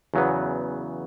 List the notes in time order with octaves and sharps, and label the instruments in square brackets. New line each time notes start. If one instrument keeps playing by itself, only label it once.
[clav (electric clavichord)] E2 C#3 F#3 B3